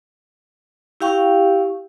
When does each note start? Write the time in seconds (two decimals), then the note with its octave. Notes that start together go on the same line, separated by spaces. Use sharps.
1.00 E4 G4 F5 G5 C#6